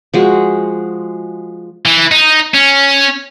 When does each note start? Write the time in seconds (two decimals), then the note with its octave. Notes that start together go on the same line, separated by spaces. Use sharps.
0.14 F3 G#3 F#4
1.86 E3
2.12 D#4
2.55 C#4